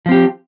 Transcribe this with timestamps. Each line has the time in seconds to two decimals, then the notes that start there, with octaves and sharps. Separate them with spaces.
0.06 F3
0.09 C4
0.12 G4